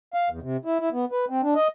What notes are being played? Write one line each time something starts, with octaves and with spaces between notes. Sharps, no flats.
F5
E2
C3
E4
E4
B3
B4
C4
D4
D#5